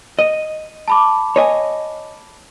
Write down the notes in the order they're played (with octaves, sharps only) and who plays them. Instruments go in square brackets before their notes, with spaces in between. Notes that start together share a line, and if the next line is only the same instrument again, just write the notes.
[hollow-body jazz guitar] D#5 [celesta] D#7
[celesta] A5 B5 D6
[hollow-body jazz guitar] C#5 D#5 G#5